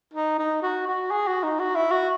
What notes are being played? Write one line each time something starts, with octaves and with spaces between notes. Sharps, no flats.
D#4
D#4
F#4
F#4
G#4
F#4
D#4
F#4
E4
F#4